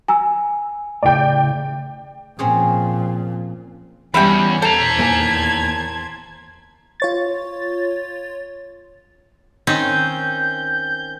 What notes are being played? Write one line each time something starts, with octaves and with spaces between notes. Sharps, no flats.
G#5 A#5 E6
A2 C#3 D5 G5
A#2 F3 C4 C#4 G#4
E2 G3 C#4 F#4 G4 E5 B5
E2 A4 C5 A5 A#5 G#6
D#2 A#3 G#5
F4 C#5 A6
D#3 C4 C#4 G6